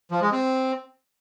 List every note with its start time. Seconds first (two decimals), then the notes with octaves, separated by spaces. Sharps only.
0.11 F3
0.22 G#3
0.32 C4